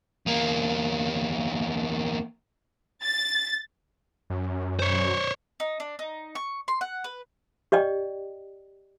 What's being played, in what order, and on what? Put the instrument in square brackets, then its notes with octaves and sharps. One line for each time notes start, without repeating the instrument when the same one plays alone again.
[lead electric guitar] E2 A#3
[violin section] A6
[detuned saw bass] F#2
[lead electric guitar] C5 C#5
[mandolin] D#4
D4
D#4
C#6
C6
F#5
B4
[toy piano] G4 D5 D#5 G5